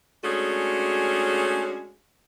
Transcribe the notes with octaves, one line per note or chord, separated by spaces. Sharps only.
G#3 A3 C#4 D4 F#4 G#4